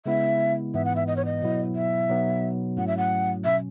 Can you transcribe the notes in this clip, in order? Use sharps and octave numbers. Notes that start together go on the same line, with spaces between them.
C#3 G#3 B3 E4 E5
G#2 E3 B3 E5
F#5
E5
D#5
C#5
D#5
B2 F#3 B3 E4
E5
B2 F#3 B3 D#4
G#2 F#3 A3 C#4 E4 F#5
E5
F#5
B2 F#3 C#4 E5